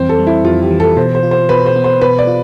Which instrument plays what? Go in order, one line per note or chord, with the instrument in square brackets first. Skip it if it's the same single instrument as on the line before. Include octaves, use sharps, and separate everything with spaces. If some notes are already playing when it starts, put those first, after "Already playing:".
Already playing: [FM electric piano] F2 E3 G3 C4 [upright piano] C5
[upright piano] A4
[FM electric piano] G3
[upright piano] E4
[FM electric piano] F2 [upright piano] F4
[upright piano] G4
[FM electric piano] E3
[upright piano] A4
[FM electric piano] B2 [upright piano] C5
[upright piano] C5
[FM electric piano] F4
[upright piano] C5
[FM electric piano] B2 [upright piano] B4
[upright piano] C5
[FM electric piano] B3
[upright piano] C5
[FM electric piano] B2 [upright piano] B4
[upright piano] D5
[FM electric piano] F4